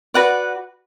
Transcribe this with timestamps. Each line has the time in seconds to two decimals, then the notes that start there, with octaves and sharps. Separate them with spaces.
0.14 F#4 B4 D5 F#5